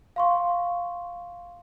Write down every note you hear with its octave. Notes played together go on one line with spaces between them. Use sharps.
F5 C6 C#6